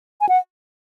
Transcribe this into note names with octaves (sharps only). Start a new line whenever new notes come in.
G#5
F#5